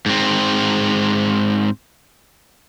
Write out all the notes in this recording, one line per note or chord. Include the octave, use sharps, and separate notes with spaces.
G#2 C4